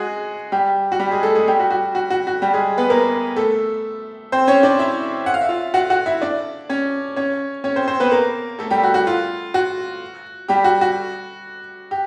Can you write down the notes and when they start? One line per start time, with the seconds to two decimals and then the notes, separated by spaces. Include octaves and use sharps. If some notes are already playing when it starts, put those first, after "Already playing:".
Already playing: G#3 F#4 G#4
0.52 G3 G4
0.92 F#4
1.00 G3 G4
1.11 G#3 G#4
1.23 A3 A4
1.35 G#3 G#4
1.48 G3 G4
1.59 F#4
1.70 F#4
1.95 F#4
2.10 F#4
2.27 F#4
2.42 G3 G4
2.53 G#3 G#4
2.78 B3 B4
2.90 A#3 A#4
3.36 A3 A4
4.32 C4 C5
4.47 C#4 C#5
4.63 D4 D5
4.79 E4 E5
5.26 F#5
5.34 F5
5.41 E5
5.49 F4 F5
5.74 F#4 F#5
5.90 F#4 F#5
6.06 E4 E5
6.22 D4 D5
6.69 C#4 C#5
7.16 C#4 C#5
7.64 C#4 C#5
7.76 C4 C5
7.88 C4 C5
8.00 B3 B4
8.11 A#3 A#4
8.59 A3 A4
8.70 G3 G4
8.83 F#4
8.94 F#4
9.07 F4
9.54 F#4
10.48 G3 G4
10.64 F#4
10.81 F#4
11.91 G4